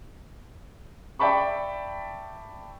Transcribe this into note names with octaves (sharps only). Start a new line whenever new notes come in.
D5 E5 G5 A5 B5 C#6